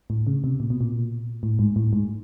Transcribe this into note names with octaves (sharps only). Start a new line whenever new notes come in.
A2
C#3
C3
A#2
B2
A#2
A2
G#2
A2
G#2